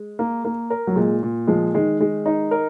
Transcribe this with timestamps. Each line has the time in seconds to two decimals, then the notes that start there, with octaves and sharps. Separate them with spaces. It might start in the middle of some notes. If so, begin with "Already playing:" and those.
Already playing: G#3
0.19 A#3
0.45 A#3
0.70 A#4
0.87 F#3
0.96 A#2 G#3
1.23 A#2
1.47 F3 G#3
1.74 D#3 G#3
2.00 G#3
2.26 D#4
2.51 A#4